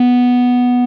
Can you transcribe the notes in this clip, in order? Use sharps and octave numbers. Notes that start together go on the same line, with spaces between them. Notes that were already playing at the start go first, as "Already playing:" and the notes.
Already playing: B3